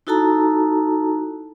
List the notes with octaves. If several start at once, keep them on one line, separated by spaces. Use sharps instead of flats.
D#4 E4 F#4 A4 A5 A#5